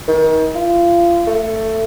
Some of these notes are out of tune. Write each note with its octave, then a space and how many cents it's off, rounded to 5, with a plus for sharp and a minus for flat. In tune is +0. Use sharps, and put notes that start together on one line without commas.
D#3 +30
F4 -30
A3 +10